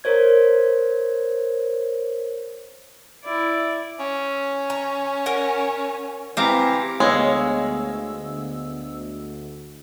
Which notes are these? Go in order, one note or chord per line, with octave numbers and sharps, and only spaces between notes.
A#4 C5 C#5 G#6
E4 D5
C#4
A#5
A#4 F#5
E3 C4 G4 F5 A#5
D2 G#3 A3 B3 C#5 D#5 F5 E6